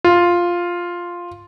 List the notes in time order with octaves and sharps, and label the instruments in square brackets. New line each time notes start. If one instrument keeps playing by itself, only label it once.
[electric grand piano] F4